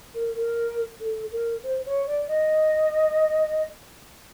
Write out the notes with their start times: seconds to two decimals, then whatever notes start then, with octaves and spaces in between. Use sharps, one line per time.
0.14 A#4
0.35 A#4
1.00 A4
1.31 A#4
1.63 C5
1.86 C#5
2.06 D5
2.28 D#5